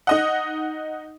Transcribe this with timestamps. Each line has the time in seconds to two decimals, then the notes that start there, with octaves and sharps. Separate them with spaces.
0.07 D#4 D#5 F#5